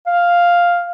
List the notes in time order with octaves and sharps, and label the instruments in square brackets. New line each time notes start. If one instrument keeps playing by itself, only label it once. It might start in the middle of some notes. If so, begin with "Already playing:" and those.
[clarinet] F5